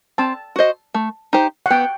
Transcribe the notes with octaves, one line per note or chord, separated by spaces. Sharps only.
C4 A5
F#4 C5 D#5
A3
D#4 G4 C5
F#5
B3 G5